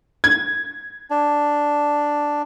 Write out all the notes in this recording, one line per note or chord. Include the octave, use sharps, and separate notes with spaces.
G#6
D4